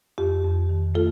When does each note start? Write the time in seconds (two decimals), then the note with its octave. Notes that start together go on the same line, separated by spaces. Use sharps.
0.18 F2 G4
0.44 F2
0.69 D#3
0.95 A3 F4 A4